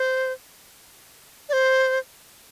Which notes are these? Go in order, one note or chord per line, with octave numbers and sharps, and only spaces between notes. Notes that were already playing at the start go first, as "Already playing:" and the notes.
Already playing: C5
D5
C5